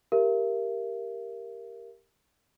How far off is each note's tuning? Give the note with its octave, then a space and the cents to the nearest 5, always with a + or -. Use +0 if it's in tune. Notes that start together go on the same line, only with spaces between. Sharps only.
G4 +5 A#4 +0 E5 +40